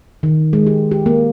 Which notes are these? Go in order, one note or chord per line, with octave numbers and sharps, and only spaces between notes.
D#3
G#3
G4
G4
A#3